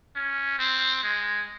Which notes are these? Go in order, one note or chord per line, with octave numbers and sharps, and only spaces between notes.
C#4
C4
G#3